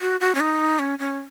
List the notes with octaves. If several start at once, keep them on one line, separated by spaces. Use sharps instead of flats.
F#4
F#4
C#4
D#4
C#4
C#4